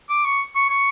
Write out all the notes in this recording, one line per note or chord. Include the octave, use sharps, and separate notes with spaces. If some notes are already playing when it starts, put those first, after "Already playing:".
D6
C#6
C#6
C#6